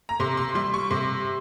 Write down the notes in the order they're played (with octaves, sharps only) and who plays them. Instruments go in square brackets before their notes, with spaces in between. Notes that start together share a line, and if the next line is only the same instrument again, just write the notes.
[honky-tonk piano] A#5
C3 C6
C6
G3 C6
C#6
C3 C6